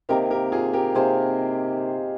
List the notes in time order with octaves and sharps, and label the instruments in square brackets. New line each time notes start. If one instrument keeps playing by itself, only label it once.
[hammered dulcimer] C3 D#3 A#3 [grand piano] G4 A#4
[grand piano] G4 A#4
F4 G#4
G4 A#4
[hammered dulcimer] C3 D#3 A#3 [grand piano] G#4 C5